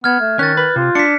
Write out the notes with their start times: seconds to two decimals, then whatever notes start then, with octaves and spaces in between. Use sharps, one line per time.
0.04 B3 F6 G#6
0.20 A3
0.39 D#3 C#4 F#6 A6
0.57 B4
0.76 C3 F4
0.95 D4 B6 C#7